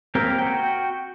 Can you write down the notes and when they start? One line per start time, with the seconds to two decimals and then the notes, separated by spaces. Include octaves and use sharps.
0.15 A#3 C4 C#4 G4 A#4
0.38 F#4 G5